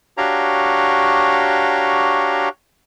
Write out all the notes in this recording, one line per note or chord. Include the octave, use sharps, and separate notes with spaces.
D4 F#4 G4 C#5 F5 A#5